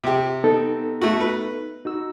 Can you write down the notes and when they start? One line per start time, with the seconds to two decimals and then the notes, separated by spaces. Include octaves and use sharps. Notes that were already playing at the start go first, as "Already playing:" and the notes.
0.04 C3 G4
0.44 B3 D#4 A4
1.01 A3 F#4
1.20 B4
1.85 D#4 F#4 E6